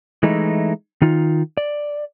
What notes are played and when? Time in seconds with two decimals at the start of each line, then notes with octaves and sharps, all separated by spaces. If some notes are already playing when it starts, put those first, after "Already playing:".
0.23 E3 G#3 A3 D#4 E4
1.02 D#3 D#4 F4
1.57 D5